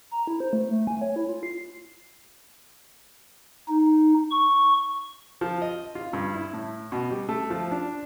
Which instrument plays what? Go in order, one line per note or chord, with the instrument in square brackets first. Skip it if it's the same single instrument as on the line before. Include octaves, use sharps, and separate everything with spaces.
[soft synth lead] A#5
E4
C5
A3
A3
G#5
C#5
E4
F4
C7
[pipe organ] D#4
C#6
[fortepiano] F3
D#5
F4
G2
E4
A2
B2
G3
A3
F3
D4